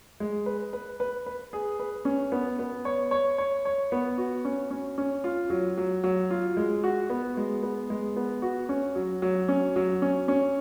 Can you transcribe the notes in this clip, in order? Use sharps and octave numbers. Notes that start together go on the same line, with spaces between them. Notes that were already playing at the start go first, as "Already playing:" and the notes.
G#3
B4
B4
B4
B4
G#4
B4
C#4
B3
B3
C#5
C#5
C#5
C#5
B3
F#4
C#4
C#4
C#4
F4
F#3
F#3
F#3
F4
G#3
F#4
B3
G#3
B3
G#3
B3
F#4
C#4
F#3
F#3
C#4
F#3
C#4
C#4